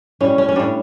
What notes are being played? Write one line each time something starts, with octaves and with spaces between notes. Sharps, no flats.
A2 G3 C#4
C#4
C#4
A2 G3 D4